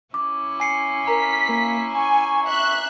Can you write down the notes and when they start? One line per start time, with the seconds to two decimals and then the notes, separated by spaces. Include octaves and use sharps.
0.14 C#4 E4 D6
0.60 G#5 C7 C#7
1.07 A#4 A#5 B6
1.49 A#3
1.92 G#5 C#6
2.46 E5 F#6